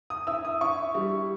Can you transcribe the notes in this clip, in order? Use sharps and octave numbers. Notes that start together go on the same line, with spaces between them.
D#6
E4 E6
D#6
E4 C#6
G3